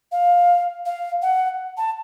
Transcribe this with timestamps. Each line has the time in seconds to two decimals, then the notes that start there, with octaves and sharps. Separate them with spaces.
0.12 F5
0.86 F5
1.22 F#5
1.77 A5